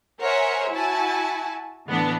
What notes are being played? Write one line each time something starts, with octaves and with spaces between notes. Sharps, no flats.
A#4 C5 C#5 E5 F#5 G#5
E4 F#4 G#5 A5
A2 D3 E3 B3 D4